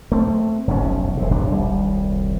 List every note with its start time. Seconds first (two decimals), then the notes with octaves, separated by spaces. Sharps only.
0.12 A3 C4
0.68 F1 B1 G2 C#4
1.17 E1 C3
1.31 D#1 G2 C3 D4
1.52 D#1 C2 G3